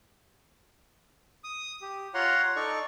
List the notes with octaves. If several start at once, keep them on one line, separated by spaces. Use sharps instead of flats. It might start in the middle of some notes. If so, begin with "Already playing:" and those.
D#6
G4
F4 C#5 F#5 A#5 C6
D#4 A4 D5 C#6